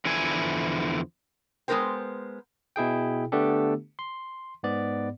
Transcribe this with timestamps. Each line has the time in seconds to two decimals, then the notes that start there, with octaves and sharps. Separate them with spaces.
0.05 E2 D3 F3 E4 G#5
1.68 G#3 B3 D#4 A#4 C5 G5
2.76 B2 E4 G#4 G5
3.32 D3 A3 B3 D4 G4 A4
3.99 C6
4.63 G#2 B3 D5